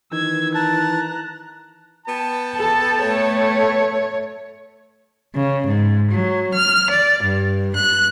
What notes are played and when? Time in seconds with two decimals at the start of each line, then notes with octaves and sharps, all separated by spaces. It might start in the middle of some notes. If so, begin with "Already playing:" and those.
0.13 D#3 E3 E6 G#6
0.55 A5 A#5 F#6
2.06 B3 G5 A5
2.56 A4
3.04 A3 C#5
5.34 C#3
5.66 G#2
6.10 F#3
6.53 F6
6.89 D5
7.22 G2
7.75 F#6